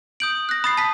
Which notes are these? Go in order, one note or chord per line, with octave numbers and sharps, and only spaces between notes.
D#6 G6 D7 F#7
D#6
F#6 A#6
B5 D#6 A6 C7
A5 B6